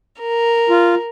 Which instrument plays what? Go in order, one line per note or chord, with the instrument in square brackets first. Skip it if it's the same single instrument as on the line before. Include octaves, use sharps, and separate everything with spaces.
[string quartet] A#4
[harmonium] F4